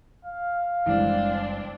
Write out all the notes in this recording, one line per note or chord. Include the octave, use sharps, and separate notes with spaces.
F5
F#1 E3 G3 G#3 C4 D4